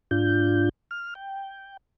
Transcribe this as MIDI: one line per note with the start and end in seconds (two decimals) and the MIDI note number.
0.11 0.69 44
0.11 0.69 62
0.11 0.69 65
0.11 0.69 91
0.91 1.14 89
1.15 1.77 79